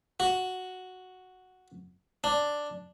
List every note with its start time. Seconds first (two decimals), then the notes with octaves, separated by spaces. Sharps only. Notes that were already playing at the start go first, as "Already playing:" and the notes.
0.20 F#4
2.24 D4